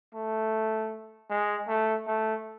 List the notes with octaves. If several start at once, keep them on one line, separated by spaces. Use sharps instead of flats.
A3
G#3
A3
A3